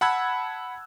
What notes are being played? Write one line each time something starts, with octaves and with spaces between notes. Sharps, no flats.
F#5 A5 B5 E6 F#6 G#6